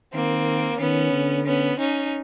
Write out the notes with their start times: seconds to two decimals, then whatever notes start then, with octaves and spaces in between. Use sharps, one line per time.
0.14 D#3 A#3 C4
0.79 D#3 B3 C#4
1.13 D3
1.46 B3 C#4
1.79 C#4 D#4